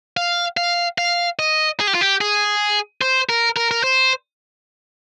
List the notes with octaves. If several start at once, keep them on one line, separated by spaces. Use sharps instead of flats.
F5
F5
F5
D#5
G#4
G4
F4
G4
G#4
C5
A#4
A#4
A#4
C5